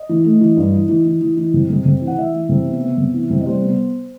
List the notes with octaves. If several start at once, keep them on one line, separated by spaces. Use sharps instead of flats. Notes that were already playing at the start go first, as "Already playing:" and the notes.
Already playing: D#5
E3
A3
E3
G2
E3
E3
E3
E3
E3
C3
C3
C3
E3
F#5
E3 E5
E3
C3
B3
B3
C3
E3
C3
D#5
G3 C5
B3